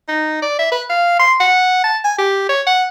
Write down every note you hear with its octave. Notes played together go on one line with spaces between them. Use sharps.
D#4
D5
E5
B4
F5
C6
F#5
A5
G#5
G4
C#5
F#5